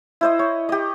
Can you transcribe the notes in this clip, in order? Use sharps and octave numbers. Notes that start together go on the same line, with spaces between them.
E4 C5 D#5
C#5
G4 D#5